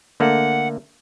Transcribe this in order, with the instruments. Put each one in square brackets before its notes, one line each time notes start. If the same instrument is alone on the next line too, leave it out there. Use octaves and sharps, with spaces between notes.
[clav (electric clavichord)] D3 A3 A#3 [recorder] F#5